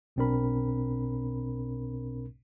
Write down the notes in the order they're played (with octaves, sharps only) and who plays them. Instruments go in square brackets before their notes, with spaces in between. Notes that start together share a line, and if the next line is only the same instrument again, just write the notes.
[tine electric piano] B1 B2 C4 D4 A#4 B5